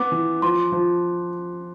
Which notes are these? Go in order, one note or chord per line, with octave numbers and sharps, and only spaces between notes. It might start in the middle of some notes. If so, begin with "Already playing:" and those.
Already playing: B3 D6
E3
F3 C6
F3